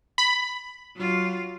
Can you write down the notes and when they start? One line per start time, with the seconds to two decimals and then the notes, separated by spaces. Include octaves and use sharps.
0.18 B5
0.95 F#3 F4